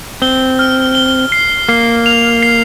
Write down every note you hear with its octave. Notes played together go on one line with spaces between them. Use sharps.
C4 G7
F6
G7
C7
A#3 C7
F7
C7